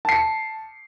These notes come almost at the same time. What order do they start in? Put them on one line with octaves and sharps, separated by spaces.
A5 C7 C#7